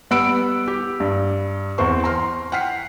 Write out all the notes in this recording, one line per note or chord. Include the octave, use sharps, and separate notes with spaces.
G3 B3 F#5 B5 E6 D7
G4
G2
E2 C4 C5 C#6
A#5 C6 F6
F#5 G5 F6 B6 C7